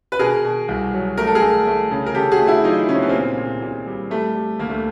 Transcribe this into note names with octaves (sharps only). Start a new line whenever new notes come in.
B4
B2 G#4 A#4
B2
C2
F#3
A3 A#4
A4
G#4 A#4
A3
A3
C#3
A#4
C#3 G4 A4
F#4 G#4
A3
E4 F#4
F#3 D#4 F4
C#3 C#4
C4
B3
A#2 A#3 C4
A#2
A#2
G3
G3 A3
G3
D2 A#3
A3